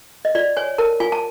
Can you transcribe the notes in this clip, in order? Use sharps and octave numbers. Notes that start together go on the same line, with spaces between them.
D#5
F4 D5
C#5 G#5
A#4 A5
F4 G#5
A5